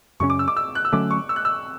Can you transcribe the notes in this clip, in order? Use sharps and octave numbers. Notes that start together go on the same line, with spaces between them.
F#2 C#3 F#3 C#4 C#6
D6
E6
D6
E6
F#6
E6
D3 F#3 A3 C#4 D6
C#6
E6
F#6
E6